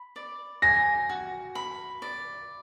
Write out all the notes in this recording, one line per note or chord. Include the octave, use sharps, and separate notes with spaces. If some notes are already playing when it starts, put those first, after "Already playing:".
Already playing: B5
D5
G#5 A#6
F#4
B5
D5